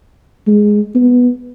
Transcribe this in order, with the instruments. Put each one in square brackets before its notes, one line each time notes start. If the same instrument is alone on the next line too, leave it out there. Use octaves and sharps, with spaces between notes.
[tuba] G#3
B3